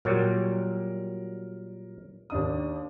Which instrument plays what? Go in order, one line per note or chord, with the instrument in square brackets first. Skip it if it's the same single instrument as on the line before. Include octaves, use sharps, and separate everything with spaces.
[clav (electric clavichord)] A#2 F#3 G3 [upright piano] A#4
[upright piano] D#2 D4 D#6